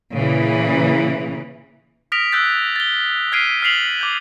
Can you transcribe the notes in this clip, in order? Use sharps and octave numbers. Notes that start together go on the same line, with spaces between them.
A#2 C#3 E3
D#6 F6 A#6 B6 D7 F7
E6 F#6 G6 A6 B6
A6 G7
F6 G#6 B6 C7 D7 D#7
F6 B6 C7 F7 F#7
D6 G6